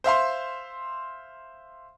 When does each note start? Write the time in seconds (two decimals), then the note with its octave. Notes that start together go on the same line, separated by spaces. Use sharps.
0.04 C5 E5 F5 C6